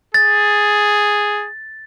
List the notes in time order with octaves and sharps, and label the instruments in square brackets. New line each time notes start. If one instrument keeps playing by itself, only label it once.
[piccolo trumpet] G#4 [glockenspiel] A6